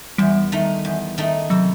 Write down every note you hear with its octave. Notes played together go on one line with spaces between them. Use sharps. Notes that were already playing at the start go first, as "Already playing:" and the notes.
E2 G3
D#3 A3 D#4
E2
D#3 A3 D#4
C3 F#3